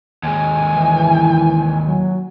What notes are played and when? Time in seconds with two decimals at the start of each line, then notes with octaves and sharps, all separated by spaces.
0.23 D#2 G#3 G#5
0.74 E3
1.88 F#3